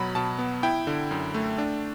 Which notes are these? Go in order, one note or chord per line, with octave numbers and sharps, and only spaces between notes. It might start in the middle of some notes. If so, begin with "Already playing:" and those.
Already playing: B2 F#3 B5
B2 A5
B3
E4 G5
D3
F#2
A3
D4